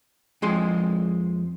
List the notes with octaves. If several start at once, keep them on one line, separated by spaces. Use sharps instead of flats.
F2 G#3 C6